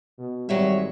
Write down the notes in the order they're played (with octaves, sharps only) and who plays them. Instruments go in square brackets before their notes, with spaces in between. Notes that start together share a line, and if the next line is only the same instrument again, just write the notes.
[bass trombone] B2
[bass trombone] G#1 [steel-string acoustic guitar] F#3 C#5 E5 [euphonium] G3